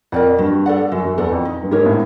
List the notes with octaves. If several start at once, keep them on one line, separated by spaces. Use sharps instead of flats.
F2 A#4 D5 F#5
G2 F#4
A4 D5 F#5
F#2 F#4
F#2
E2 A4 D5 F#5
F2
D#4
G2
G#2 G4 A#4 C#5
A2